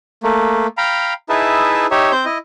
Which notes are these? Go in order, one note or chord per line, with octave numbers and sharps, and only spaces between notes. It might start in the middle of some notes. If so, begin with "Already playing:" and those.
A3 A#3
F5 G5 A#5 B5
D#4 E4 G#4 B4 E5 A5
D#4 G4 C#5 E5
C4 C5 G6
E4 D#5